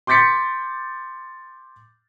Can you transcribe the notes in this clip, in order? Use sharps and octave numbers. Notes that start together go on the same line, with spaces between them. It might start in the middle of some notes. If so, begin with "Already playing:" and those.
C6 D6 G6 A6 B6 C#7